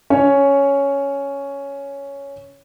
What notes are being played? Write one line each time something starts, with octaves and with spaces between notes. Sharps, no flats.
C#4 C#5